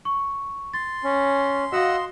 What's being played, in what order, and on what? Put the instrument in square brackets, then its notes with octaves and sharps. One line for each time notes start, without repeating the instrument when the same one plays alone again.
[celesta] C#6
[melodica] C6 [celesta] A6
[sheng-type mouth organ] C#4
[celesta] F#4 F5 [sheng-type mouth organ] D#5 F#5 E6